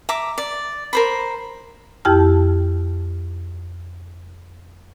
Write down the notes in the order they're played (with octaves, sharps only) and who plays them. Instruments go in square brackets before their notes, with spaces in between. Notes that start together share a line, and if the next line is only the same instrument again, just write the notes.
[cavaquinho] E5 A#5 D6
D5
A#4 C5 B5
[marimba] F2 E4 G4 G5 A5 F6